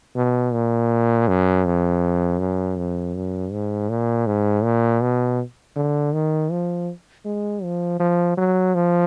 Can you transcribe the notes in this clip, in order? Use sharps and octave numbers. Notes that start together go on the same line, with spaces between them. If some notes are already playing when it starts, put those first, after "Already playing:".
B2
A#2
F#2
F2
F#2
F2
F#2
G#2
A#2
G#2
A#2
B2
D3
D#3
F3
G#3
F3
F3
F#3
F3